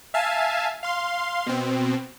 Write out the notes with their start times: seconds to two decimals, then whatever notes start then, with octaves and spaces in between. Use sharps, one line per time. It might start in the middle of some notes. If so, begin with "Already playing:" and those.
0.14 E5 F5 G#5 A5
0.83 F5 C6
1.46 B2 C4